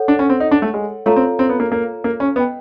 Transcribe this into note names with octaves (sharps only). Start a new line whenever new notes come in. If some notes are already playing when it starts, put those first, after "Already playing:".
Already playing: A4 C#5 F#5
D4
C#4
C4
D#4
D4
A3
G#3
A3 F4 A4 C#5 F5 A#5
C4
C4
B3
A#3
A#3
A#3
C#4
B3 B4 D#5 G5